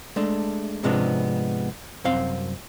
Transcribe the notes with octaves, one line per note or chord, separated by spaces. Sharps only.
G#3 A3 D4
G#2 C3 F3 G#3 B3 D4
C2 F#2 C4 F5